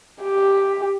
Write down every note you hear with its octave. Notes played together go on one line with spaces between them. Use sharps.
G4